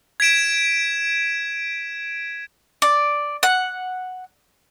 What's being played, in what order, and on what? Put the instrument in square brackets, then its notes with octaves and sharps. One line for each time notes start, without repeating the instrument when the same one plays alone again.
[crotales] G#6 B6 D7 E7
[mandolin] D5
F#5